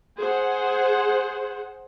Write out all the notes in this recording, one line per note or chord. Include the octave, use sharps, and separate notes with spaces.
G#4 C5 F#5